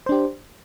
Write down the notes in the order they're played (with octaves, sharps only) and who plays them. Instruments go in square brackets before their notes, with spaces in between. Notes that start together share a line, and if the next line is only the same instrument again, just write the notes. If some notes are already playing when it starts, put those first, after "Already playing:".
[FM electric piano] C5
D4
G4